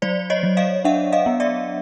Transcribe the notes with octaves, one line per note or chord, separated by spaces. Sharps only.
F#3 C5 D5
C#5 D#5
F#3
D#5 F5
D4 E5 F#5
D#5 F5
B3
D5 E5